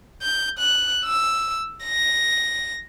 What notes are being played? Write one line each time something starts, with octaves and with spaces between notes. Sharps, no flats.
G6
F#6
E6
A#6